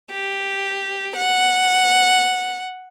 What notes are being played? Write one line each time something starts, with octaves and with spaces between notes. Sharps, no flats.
G4
F#5